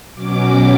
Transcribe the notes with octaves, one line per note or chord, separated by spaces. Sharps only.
B2 F#3 C#4 D6